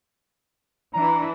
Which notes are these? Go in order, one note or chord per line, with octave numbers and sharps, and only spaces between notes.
E3 D4 E4 A#5